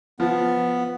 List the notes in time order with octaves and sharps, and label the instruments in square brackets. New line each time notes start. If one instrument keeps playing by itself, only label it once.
[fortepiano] F3 [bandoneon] B3